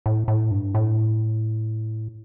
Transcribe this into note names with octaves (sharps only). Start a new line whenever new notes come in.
A2
A2
G2
A2